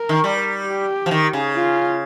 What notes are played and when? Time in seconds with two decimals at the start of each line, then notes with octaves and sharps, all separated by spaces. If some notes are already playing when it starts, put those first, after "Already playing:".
Already playing: A#4
0.09 D#3
0.24 G3
0.67 G4
1.06 F3
1.11 D#3
1.33 C#3
1.55 F4